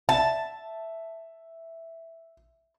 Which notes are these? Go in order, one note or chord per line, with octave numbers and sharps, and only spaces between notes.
E5 A5